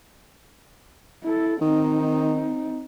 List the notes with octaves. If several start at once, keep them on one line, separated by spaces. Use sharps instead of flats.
E4 A4
D#3 C4 D#4